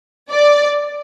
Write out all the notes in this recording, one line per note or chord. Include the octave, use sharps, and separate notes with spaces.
D5